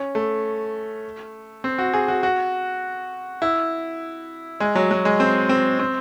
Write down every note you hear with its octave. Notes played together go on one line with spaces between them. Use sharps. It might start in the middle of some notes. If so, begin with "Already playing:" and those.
Already playing: C#4
A3
C4
F#4
G#4
F#4
F#4
E4
G#3
F#3
F#3
G#3
C4
C4
C4